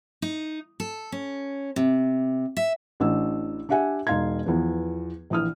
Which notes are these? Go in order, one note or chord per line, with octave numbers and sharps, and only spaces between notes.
D#4
A4
C#4
C3
E5
A1 D4 E6
D4 G4 E5 F#5 G#5
E1 D#4 F5 C6 G#6
E2 F3 B3
A#1 E3 D#6 F6